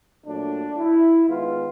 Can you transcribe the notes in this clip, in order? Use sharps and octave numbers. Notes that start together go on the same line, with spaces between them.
A#2 F#3 A3 D4
E4
D#3 G#3 B3 F4